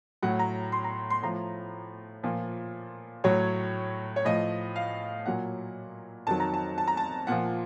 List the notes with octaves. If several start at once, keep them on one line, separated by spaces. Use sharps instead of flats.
A2 F#3 F#5
A#5
C6
A#5
C6
A2 F3 A#5
A#2 F3
A2 F#3 C#5
C#5
A2 F3 D#5
F5
A#2 F#3 F#5
F2 D#3 F#3 A5
A#5
A5
A5
A#5
A5
A#2 F3 F#5